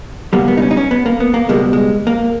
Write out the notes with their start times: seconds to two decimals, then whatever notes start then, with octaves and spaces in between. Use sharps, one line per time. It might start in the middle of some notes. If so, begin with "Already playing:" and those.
0.33 C#2 B2 G3 A#3
0.48 B3
0.57 D#4
0.62 C#4
0.71 D#4
0.77 C#4
0.91 B3
1.06 A#3
1.20 B3
1.34 A#3
1.49 C#2 B2 G3 G#3
1.73 G#3
2.07 A#3